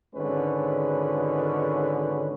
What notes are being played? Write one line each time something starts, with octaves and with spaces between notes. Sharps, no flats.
G#1 D3 G#3 C#4 B4